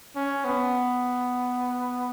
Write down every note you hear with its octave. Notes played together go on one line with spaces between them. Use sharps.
C#4
B3